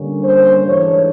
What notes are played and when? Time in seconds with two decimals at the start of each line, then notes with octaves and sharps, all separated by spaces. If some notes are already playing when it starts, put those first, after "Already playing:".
Already playing: D3 G3 A#3 C#4
0.22 C5
0.64 G#2 E3 A3 D4 C#5